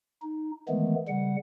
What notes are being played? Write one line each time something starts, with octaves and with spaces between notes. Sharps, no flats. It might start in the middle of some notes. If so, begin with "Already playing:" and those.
D#4
D#3 E3 G#3 A3 B3
C#3 G3 F#5